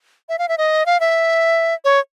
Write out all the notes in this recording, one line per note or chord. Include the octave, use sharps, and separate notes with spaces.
E5
F5
E5
D#5
F5
E5
C#5